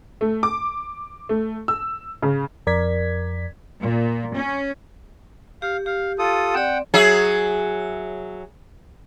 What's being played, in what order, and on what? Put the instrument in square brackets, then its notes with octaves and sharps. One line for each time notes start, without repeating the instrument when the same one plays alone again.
[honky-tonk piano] A3
D6
A3
E6
C#3
[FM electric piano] F2 A#4 D5 G#6 B6
[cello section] A#2
C#4
[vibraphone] G4 [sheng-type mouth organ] F5
[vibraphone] G4 [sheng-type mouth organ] F5
[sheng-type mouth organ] F4 A4 D#6
[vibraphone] C4 D5 [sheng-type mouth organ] F#5 G5
[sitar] F#3 G#4 E5